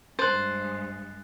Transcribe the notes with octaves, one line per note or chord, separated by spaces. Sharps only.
G2 G#3 C5 F#6 A6